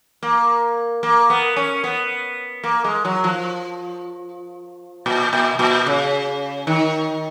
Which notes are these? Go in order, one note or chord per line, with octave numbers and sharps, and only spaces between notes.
A#3
A#3
B3
C#4
B3
A#3
G#3
F#3
F3
A#2
A#2
A#2
C#3
D#3